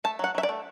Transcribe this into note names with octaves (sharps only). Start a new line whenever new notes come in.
A3 A5
F#3 F#5
F#3 E5
D5
A3